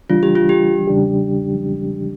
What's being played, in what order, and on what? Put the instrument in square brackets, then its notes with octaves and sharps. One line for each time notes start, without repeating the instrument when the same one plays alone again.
[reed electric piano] C#2 C#3 E3 G3 D4 [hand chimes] F4
[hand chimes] G4
F4
G4
[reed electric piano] E2 C#3 G3 D4 G4